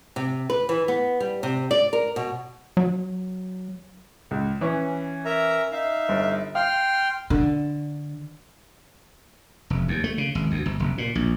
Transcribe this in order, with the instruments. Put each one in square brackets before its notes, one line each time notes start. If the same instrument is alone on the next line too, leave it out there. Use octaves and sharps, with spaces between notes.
[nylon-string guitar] C3
B4
E3
B3
G3
C3
D5
A#4
B2
[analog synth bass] F#3
[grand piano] C#2
E3 C#4
[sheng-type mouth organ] A#4 E5 A#5
D#4 E5 F5
[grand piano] G1
[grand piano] F5 [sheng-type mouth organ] G5 C6 F6
[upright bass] D3
[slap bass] F1
D#2
A3
C#3
G#1
D2
G1
F1
A#2
A#1